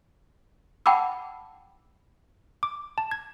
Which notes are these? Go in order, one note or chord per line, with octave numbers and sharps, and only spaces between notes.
F#5 G5 A5 B5 D6 E6
D6
A5
G#6